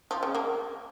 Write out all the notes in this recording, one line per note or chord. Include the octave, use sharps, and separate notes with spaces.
F3
C#3
A#3